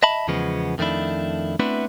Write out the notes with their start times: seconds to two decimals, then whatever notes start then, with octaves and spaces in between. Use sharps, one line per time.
0.03 D#5 E5 A5 B5
0.28 E2 C#3 F3 G#3 B3
0.78 F2 D#3 A3 B3 D4 E4
1.60 A3 B3 C4 D4 E4 B4